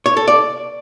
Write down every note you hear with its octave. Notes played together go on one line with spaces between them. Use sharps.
C#5
A4
D5